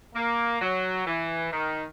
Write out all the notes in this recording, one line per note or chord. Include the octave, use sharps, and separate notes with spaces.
A#3
F#3
E3
D#3